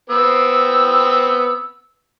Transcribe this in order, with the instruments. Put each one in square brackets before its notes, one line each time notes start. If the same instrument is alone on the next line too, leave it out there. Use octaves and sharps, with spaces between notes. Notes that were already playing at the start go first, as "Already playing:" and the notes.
[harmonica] B3 C4 [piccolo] E6